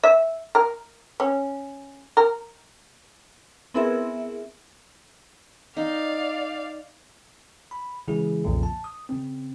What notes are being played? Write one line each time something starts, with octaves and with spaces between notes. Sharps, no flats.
E5
A#4
C#4
A#4
B3 C4 E4 G#4 A#4 E5
D#4 D5 F5
B5
C#3 E3 G#3 E4 G#4
B1 F2 A#2 C#3 F3
A5
D#6
C#3 C4